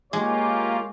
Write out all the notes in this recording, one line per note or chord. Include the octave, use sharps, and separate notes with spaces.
G#3 A#3 F4 G4 C#5 D6